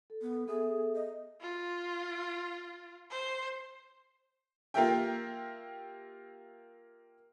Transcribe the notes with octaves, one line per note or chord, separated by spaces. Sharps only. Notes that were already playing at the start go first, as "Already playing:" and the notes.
A4
B3
B3 G#4 A4 E5
D#5
F4
C5
A#3 F4 G4 A#4 E5 G5